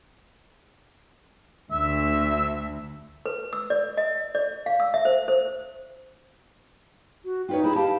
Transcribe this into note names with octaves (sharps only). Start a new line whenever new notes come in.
D2 E5
B4
E6
D5
D#5
D5
F5
E6
E5
C5
C5
F#4
D#4 F4 B4 C#5 G5
E4 G#4 B5
G4 F5 G5 A5